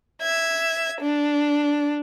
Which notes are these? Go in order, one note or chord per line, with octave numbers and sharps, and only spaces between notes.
E5 G#6
D4